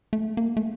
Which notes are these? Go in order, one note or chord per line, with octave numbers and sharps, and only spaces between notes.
A3
A#3
A3